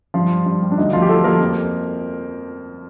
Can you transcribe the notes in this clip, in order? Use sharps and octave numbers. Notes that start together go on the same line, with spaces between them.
G2 F3 F4
G3
G2
G3
D4
D2 D#4
D2 F3 F4
G4
F3 A3 A4
F3 A#3 A#4
F2